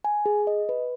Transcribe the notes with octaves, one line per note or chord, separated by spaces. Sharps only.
G#5
G#4
D#5
B4